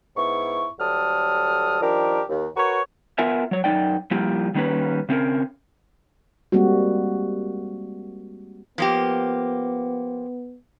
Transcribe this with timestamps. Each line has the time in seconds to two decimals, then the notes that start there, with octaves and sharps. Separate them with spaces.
0.16 G#2 B3 E4 C#6
0.79 D2 F#3 G3 A4 D#6 F6
1.81 D#3 F3 D4 G4 A#4
2.29 D#2
2.56 F#4 A#4 B4 C#5 A#5 C#6
3.18 B3 F4 A#4 E5 G#5
3.51 F#3 C#5
3.64 F#2 A#3 D#4 D5 G5
4.11 F3 G3 A#3 E4 F4 G4
4.54 D#3 G3 A#3 B3 C#4 B4
5.09 C#3 C4 C#4 A#4
6.52 G3 G#3 A#3 C4 F#4
8.78 F3 A#3 B3 G4